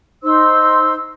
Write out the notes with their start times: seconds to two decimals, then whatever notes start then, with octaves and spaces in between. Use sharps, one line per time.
0.23 D#4 C5 C6 E6